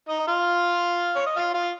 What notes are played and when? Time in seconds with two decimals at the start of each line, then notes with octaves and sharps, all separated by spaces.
0.09 D#4 D#5
0.20 D#5
0.27 F4 F5
1.16 C#5
1.26 D#5
1.36 F4 F5
1.54 F4 F5